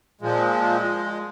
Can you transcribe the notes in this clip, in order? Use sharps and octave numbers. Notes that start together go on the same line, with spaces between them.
A#2 F3 G#3